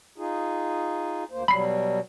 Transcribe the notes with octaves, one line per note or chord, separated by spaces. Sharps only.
D#4 F4 G#4
D2 A#3 C5
B2 F#3 G3 B5 C7